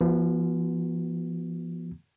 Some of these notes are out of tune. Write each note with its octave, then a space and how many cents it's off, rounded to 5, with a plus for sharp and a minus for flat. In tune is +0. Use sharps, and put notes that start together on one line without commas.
F3 -40 B3 -25 F#4 +0